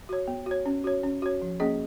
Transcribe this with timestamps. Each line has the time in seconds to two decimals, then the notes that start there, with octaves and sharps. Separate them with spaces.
0.09 F#4 C#5
0.28 B3
0.46 F#4 C#5
0.66 C#4
0.84 F#4 C#5
1.03 C#4
1.22 F#4 C#5
1.42 F3
1.60 A#3 C#4 G#4 D#5